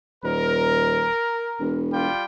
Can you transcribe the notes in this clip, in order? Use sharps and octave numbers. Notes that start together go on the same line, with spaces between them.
D#1 A#4
E1
G3 F4 G5